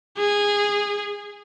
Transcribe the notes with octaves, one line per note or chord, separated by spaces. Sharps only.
G#4